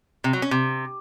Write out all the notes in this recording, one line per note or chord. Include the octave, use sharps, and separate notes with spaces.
C3
F#3
C#4
C3